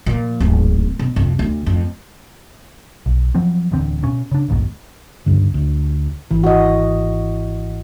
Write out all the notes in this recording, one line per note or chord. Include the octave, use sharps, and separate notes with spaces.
A#2 F3
D1 G#1
B2
C2 F2
D2
F2
B1
F3 F#3 C4
D1 E2 D3 C4
B2 C#4
C#3 D4
A#1 D#2 G#2 B2
C#2 G2 D3
D2
G#1 E3
F#4 D#5